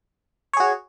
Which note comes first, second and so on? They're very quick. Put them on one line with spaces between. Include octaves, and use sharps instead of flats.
C#5 G#4 F#4